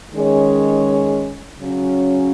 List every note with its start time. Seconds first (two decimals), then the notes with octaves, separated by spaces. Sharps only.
0.13 D#3 G#3 C#4 G#4 C#5
1.60 C#3 F#3 C#4